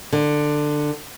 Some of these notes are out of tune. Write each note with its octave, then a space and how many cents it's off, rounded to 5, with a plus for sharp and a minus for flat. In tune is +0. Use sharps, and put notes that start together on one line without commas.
D3 +15